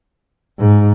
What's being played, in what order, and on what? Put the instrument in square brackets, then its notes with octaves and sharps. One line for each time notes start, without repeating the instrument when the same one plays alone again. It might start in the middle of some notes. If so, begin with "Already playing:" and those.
[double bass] G#2